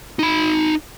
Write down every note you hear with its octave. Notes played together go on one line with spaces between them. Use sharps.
D#4 B5